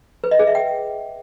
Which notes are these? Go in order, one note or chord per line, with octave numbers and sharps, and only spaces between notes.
B4
D#5
G#4
E5
G5